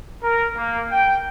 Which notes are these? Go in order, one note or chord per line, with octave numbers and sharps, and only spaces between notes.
A#4
A#3
G5